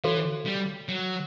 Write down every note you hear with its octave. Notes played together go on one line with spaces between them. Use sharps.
E3 F#4 A4 C#5 F5
G3
F#3